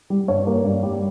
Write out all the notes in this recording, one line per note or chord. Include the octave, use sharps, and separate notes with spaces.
G3
G2 C#5
A#3
G2
G3